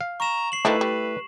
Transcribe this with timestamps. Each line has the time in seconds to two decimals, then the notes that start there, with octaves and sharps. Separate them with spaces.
0.01 F5
0.20 A#5 C#6 E7
0.52 C7 F#7
0.65 D#3 F3 A3 D4 E4 B4
0.81 G3